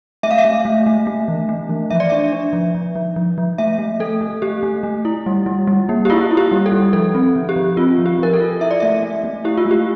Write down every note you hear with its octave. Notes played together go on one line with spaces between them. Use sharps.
A3 E5
F5
E5
A3
A3
A3
A3
E3
A3
E3
F3 E5
D5
D4 E5
D4
F3
F3
F3
F3
F3
A3 E5
A3
A3 A4
A3
A3 G4
A3
A3
E4
G3
G3
G3
A#3
G4
E4 F4
E4
G4
G3
A4
G3
F3 A4
C4
F3
G4
F3
C4 F4
F3
G4
F3 A#4
A4
F4
E4 E5
D5
A3 E5
A3
A3
E4 G4
F4
A3
G4